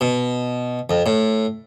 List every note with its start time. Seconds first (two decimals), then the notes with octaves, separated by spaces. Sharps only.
0.01 B2
0.90 F2
1.06 A2